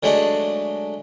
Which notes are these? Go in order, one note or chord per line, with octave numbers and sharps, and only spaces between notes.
D3 F#3 G#3 A3 D4 D#4